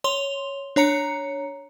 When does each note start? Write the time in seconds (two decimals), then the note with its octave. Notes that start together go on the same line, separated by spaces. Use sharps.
0.04 C#5 C6 F7 G7
0.76 D4 C#5 A#5 C#7